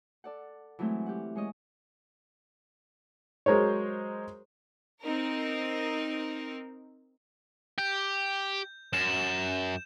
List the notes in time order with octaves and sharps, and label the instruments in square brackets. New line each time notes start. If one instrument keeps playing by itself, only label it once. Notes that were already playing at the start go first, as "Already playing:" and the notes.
[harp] A4 D5 F#5
E3 F#3 G#3 A3 C4
G4 F#5
G#3 C#5 D#5
[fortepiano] F#3 G#3 A#4 C5 C#5
[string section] C4 D#4 A#4
[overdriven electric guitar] G4 [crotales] G6
[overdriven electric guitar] F#2 [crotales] E7